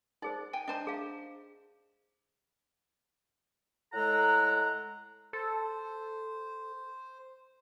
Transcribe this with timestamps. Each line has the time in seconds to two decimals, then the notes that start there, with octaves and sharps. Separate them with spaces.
0.22 D#4 G#4 C5 D5
0.53 G5 G#5
0.68 D4 C5 D#5 A5 A#5
0.87 G#4 F5
3.93 A2 G#3 A4 F#5 A#5
5.33 A4 C5